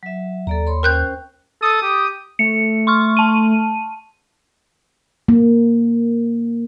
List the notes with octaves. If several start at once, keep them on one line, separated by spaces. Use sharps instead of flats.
F#3 E5
D#2 A4 D5 A#5
C#5 B5 C6
C#4 A#4 C5 G5 F#6 G6
A4 D#6
G4
A3 C#7
C6 C#6 F6
A5 D#7
A#3